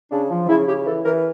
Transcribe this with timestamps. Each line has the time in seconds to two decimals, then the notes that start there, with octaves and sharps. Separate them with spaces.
0.11 C#3 D4
0.30 F3
0.49 C#3 E4
0.68 C#3 G4
0.86 E3 A4
1.05 E3 A#4